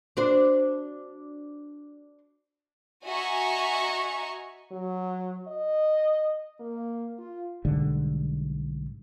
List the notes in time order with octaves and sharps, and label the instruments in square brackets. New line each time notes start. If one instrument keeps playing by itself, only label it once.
[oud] D4 F#4 C5
[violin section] F#4 D#5 E5 G#5 A#5 C#6
[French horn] F#3
D#5
A#3
F4
[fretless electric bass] B1 G#2 D3 G3